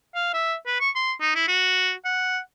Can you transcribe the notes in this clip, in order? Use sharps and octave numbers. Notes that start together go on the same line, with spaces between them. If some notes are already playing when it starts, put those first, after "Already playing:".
F5
E5
B4
C#6
C6
D#4
E4
F#4
F#5